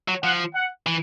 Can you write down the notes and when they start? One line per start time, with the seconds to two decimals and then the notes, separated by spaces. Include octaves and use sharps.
0.08 F#3
0.23 F3 F#5
0.55 F#5
0.86 E3